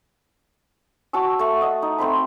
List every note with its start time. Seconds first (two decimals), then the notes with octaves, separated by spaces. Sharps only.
1.13 F#4 A5 C#6 E6
1.39 A3 F#5 A5 C#6
1.62 D#5 F#5
1.82 D#4
1.98 A3 C4 C5 B5